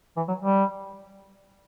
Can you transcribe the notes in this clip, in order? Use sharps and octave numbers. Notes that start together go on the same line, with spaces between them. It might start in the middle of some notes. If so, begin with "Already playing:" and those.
E3
F#3
G3